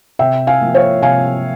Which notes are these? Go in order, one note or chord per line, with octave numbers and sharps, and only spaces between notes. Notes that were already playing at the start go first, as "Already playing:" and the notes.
C3 E5 G5
F5 G#5
F3 A#3
C#5 F5
C3 F5 G#5